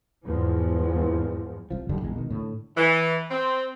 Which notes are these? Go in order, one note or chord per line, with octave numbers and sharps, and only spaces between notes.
E2 G#2 F3
C2 F3
F#2 D3 D#3 G3
A#1 E2 D3 G#3
B2 D#3
A2 D3
E3
C4